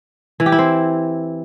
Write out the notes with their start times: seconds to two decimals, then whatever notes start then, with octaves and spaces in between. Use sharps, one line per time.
0.40 E3
0.46 G4
0.52 E4
0.58 C4